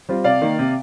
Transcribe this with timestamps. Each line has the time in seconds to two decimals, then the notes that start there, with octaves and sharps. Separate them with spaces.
0.09 G3 C4 F4
0.24 C3 D5 F5
0.42 D#3 A#3
0.59 C3